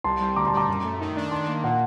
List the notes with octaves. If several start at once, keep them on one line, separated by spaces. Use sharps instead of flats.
C2 A5 C6
G3
D2 A#5 D6
A5 C6
G3 A#5 D6
F#2
A3
D#3
D4
D#3 A5 C6
A#3
A#2 F#5 A5